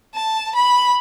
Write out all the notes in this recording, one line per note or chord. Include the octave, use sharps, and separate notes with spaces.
A5
B5